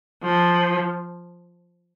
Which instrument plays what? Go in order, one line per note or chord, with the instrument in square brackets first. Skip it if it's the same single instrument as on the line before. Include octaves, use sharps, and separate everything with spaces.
[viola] F3